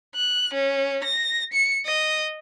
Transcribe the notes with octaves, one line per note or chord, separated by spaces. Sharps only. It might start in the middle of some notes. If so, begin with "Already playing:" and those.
F#6
C#4
A#6
C#7
D#5